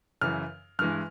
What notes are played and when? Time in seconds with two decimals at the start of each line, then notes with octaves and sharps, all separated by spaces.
0.21 F#2 C#3 E3 F6
0.79 G2 E3 G#3 F6